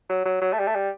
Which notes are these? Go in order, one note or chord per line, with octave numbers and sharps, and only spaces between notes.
F#3
F#3
F#3
A3
G3
A3
G3